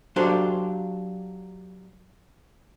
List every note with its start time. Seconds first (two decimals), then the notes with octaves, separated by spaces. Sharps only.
0.16 F#3 D4 F4 G4 A4 C5